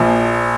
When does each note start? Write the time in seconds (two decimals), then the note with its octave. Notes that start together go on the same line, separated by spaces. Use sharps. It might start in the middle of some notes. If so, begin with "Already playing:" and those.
Already playing: A#1 A#2 F3